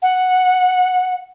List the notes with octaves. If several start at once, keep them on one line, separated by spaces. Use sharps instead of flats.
F#5